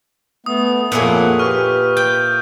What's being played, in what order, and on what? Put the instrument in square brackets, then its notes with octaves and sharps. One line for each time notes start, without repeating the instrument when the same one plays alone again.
[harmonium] A3 B3 [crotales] D#6
[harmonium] F2 A#3 F#5 [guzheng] A#2 E4 G#4 [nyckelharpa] A4 C#5
[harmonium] G4 [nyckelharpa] B4 [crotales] C#6 F6
[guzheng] G5 [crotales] G6